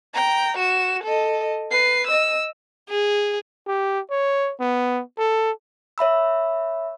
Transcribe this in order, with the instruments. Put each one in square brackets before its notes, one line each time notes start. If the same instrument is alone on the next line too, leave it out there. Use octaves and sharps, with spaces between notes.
[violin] G5 A#5
F#4 E7
A4 D#5
B4 C7
D#5 E6
[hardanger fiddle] G#4
[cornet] G4
C#5
B3
A4
[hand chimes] C#5 E5 B5 E6